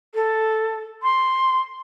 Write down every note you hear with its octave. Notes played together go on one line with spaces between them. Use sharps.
A4
C6